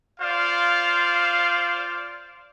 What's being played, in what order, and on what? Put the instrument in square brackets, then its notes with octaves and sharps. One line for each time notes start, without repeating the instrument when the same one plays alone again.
[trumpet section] F4 C5 D5 F5